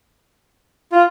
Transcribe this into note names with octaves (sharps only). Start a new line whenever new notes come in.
F4